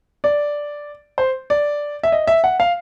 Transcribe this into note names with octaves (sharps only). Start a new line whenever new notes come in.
D5
C5
D5
E5
D#5
E5
F#5
F5